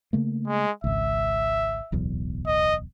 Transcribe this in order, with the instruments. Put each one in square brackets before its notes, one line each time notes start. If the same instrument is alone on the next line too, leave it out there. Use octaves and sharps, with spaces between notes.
[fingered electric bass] C#3 A3 A#3
[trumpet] G#3
[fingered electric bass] G#1 C#2 [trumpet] E5
[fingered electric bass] D1 B1 E2
[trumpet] D#5